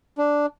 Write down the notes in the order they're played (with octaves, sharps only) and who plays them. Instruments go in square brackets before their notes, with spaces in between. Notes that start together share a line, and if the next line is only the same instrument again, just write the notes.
[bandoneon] D4